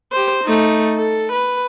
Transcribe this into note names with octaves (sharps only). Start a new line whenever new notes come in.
G4 C5
A3 D#4
A4
B4